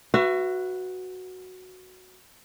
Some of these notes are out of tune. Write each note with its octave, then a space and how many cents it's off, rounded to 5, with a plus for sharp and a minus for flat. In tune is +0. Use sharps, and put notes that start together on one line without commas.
F#4 +0 B4 +0 E5 +35